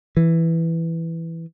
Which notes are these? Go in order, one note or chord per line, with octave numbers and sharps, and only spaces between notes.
E3